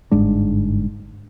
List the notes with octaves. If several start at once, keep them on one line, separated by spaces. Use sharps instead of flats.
G1 G#2 G#3 D4